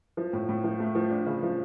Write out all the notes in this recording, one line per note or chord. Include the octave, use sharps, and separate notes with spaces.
F3
A2
A2
F3
A3
F3
D4
C#3
F3